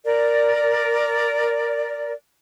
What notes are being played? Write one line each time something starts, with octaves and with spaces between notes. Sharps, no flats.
A#4 D5